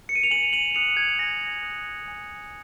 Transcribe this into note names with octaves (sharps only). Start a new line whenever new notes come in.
C#7
D#7
F7
G#5 D#7 F#7
D#7 F#7
D#6 F#6 C#7 F7
G#6
G#5 A#6
D#6 F#6
G#5